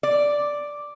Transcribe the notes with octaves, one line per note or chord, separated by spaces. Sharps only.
D5